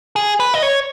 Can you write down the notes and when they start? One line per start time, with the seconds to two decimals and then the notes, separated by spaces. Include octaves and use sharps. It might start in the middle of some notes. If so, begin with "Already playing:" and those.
0.16 G#4
0.40 B4
0.54 D#5
0.62 C#5